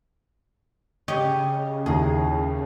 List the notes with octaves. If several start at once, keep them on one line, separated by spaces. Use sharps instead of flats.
C#3 G4 C#5 D#5
D#2 E4 G#4 A#5